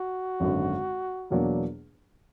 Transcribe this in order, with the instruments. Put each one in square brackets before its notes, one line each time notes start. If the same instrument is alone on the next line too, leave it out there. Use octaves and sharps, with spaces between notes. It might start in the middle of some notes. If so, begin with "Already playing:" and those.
Already playing: [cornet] F#4
[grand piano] G#1 F#2 D3
E2 B2 F#3 A#3 D4